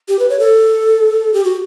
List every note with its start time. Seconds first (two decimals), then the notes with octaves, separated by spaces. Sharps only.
0.08 G4
0.19 B4
0.29 C#5
0.39 A4
1.34 G4
1.44 F#4